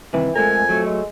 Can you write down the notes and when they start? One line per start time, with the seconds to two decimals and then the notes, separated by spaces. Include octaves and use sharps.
0.13 G2 C3 D#3 E3
0.35 F2 G#3 A3 A#4 G#5
0.69 F#3 A3
0.86 G#3